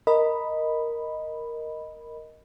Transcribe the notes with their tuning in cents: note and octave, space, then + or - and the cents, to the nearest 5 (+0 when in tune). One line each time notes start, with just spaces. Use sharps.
A#4 +0 D#5 +0 B5 +0